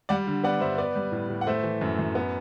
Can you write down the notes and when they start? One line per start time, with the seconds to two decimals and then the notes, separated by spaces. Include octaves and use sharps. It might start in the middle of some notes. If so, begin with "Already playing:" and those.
0.09 G3 D5 F#5
0.27 D3
0.44 B3 D5 F#5
0.60 G2 C5 E5
0.78 B3 B4 D5
0.95 G3
1.12 A2
1.30 A2
1.41 F#5
1.47 A3 C5 E5
1.64 E3
1.81 F#2
1.99 F#2
2.15 B3